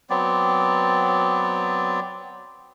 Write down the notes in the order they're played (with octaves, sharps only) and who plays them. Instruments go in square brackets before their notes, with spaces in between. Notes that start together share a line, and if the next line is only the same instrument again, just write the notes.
[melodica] F#3 B3 C4 D5